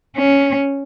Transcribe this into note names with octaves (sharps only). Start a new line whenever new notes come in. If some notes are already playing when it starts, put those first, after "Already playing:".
C#4